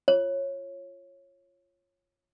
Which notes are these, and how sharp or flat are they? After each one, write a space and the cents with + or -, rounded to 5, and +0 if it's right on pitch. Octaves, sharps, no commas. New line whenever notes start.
F4 -15 C#5 -15